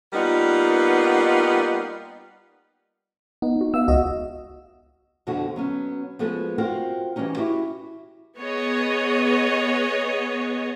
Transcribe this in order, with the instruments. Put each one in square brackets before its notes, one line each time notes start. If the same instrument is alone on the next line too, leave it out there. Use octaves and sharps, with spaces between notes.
[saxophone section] G3 A#3 B3 D#4 F4
[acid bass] B3 [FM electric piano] D#4
[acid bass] F#4
[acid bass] B3 [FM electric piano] E5 F5 E6
[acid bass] C#2 [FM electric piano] F#4 D#5
[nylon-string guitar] F2 B2 D3 D4 F#4
F#3 B3 C#4
F3 G#3 B3 F#4 A4
C4 F4 F#4 A#4 C5
E3 G3 A#3 C#4 D#4
E4 F#4 G4
[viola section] B3 G#4 C#5 D#5